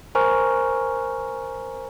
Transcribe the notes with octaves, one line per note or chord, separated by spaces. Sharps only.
A#4 C5 G#5 A#5 C#6 F6